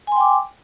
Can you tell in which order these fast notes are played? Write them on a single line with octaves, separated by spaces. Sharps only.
G#5 C6 G5 D6